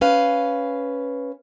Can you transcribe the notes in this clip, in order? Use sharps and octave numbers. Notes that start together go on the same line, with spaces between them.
C#4 B4 F5